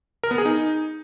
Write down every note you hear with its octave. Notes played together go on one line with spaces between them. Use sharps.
A#4
B3
G#4
D#4